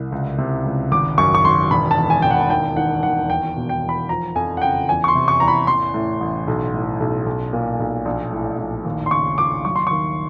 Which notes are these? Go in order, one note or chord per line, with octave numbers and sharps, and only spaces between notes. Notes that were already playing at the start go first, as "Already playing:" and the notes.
Already playing: C2
C#2
C3
C#2
G#1 D6
F#2 C#6
C#6
G#1 C6
E1 B5
A5
E2
G#5
E1 G5
F#5
D#2 G5
D#3 F#5
D#2 F#5
E2 G5
B2
G5
E2
B5
F3 A#5
F2 G#5
F#5
F#1 G5
E2 G#5
C#6
C6
C3
C#6
E2 A#5
B5
A1 C6
A2
A1
B1
A2
B1
B1
A#2
B1
A#1
A2
A#1
D#2
C6
C#3 C#6
D#2 D6
F#3 C#6
C6
D#2 C#6